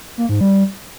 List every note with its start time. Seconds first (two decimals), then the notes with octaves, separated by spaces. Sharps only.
0.18 A#3
0.29 G#2
0.41 G3